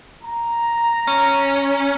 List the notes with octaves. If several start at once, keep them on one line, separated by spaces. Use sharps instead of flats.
A#5
C#4